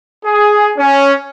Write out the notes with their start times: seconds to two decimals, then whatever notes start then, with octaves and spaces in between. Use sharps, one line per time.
0.24 G#4
0.78 C#4